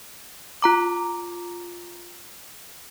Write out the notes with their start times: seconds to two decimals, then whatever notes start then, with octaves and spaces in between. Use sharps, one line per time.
0.62 F4 A#5 D6